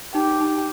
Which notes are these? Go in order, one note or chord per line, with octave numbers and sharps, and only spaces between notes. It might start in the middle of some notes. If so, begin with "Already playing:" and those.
D#4 G4
D#4